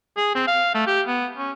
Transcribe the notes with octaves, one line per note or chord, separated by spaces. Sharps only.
G#4
C4
F5
A3
G4
B3
C#4